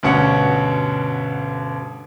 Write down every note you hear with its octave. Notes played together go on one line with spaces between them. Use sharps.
D2 G2 B2 C#4 F#5